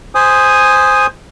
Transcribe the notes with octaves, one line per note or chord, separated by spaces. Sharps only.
C5 G#5 D#6